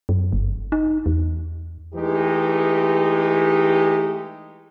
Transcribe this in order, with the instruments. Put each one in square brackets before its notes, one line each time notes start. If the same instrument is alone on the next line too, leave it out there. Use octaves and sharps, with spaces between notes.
[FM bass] F#2
G1
D#4
E2
[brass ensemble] E3 G#3 A3 D#4 G4